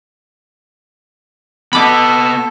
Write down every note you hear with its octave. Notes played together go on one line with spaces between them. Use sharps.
B3 A4 D#5 B5 D6